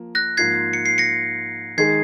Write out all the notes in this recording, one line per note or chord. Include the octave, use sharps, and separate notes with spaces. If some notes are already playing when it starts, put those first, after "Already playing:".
Already playing: F3 A#3
F#6 A#6
G#2 F3 A#3 F4 G#6 C7
C#7
C7
A#6 C#7
D#3 G#3 D#4 G#4 G#6 C7